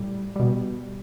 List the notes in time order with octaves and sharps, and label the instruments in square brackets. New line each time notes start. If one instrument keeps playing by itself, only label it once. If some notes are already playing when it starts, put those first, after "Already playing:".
Already playing: [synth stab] A2 G3
B2 G3